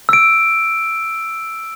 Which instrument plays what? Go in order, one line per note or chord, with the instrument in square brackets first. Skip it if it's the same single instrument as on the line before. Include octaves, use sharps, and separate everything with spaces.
[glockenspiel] E6 D7